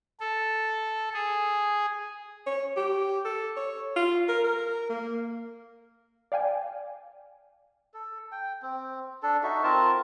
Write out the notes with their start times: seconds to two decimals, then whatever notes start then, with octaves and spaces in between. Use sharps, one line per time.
0.20 A4
1.14 G#4
2.47 C#5
2.77 G4
3.25 A4
3.57 C#5
3.96 F4
4.28 A#4
4.44 A#4
4.90 A#3
6.32 D5 F5 G5 G#5
7.94 A4
8.32 G5
8.62 C4
9.23 D4 A4
9.43 D#4 F#4 A4 E5
9.63 C4 F4 A#4 A5